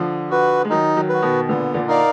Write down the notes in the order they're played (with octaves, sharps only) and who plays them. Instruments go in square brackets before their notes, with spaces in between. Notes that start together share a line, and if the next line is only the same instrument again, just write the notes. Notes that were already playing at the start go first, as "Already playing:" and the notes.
Already playing: [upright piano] D3 F3
[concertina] F#4 B4
[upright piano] G#3
[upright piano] D#3 F#3 [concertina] D#4
[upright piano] D#3 F#3
[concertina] F#4 B4
[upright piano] B2 D#3
[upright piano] A#2 D3 [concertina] B3
[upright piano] A#2 D3
[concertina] D#4 A#4 D5 F5